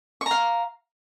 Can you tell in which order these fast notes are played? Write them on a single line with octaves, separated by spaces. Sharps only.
C#6 A#5 F5